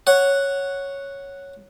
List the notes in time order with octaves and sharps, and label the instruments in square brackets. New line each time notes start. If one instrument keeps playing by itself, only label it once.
[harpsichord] C#5 F#5